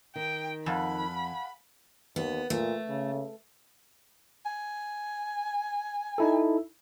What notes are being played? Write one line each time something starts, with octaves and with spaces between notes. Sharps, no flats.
D#3 G5
F2 F5 F#5 G#5 B5
D#2 B3
A#2 A3
C#3
G#5
D#4 E4 A4